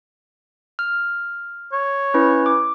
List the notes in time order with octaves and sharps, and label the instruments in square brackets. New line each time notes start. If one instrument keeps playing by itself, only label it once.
[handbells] F6
[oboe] C#5
[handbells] C#4 E4 B4
D6